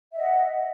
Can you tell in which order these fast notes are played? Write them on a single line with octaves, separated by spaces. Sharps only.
E5 D#5 F#5